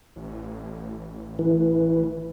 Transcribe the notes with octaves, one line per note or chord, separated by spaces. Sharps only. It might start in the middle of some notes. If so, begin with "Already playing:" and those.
A1
E3